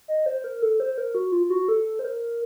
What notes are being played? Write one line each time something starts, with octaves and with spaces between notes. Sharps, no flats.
D#5
C5
A#4
A4
C5
A#4
F#4
F4
F#4
A4
C5
A#4